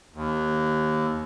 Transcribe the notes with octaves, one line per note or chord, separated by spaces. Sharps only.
D#2